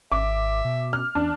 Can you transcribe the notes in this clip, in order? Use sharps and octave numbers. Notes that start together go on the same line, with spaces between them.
G#1 E5 D6
B2
F6
E2 D4